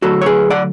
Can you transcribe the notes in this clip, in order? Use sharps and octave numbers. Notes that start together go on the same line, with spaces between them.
D3 F#3 A3 F#4 A4
C#5
G#4 B4
D5 F#5